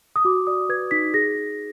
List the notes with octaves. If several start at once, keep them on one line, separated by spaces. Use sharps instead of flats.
D#6
F#4 D6
D5 D#6
B4 G#6
D#4 B6
G#4 A#6
D#4